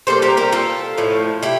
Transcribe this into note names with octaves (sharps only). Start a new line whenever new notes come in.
C3 G3 A#3 A4 C5
G4 A#4
G4 A#4
F4 A4
A2 F3 A3
E4 G4